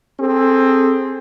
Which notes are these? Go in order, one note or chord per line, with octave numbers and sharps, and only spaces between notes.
C4 G#4 A4